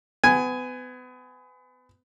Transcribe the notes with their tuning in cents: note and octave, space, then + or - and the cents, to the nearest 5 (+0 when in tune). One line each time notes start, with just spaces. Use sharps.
B3 +35 G#5 +0